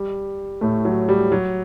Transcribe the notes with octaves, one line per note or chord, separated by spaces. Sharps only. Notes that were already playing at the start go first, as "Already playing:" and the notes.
Already playing: G3
A2 A3
F#3
G3
F#3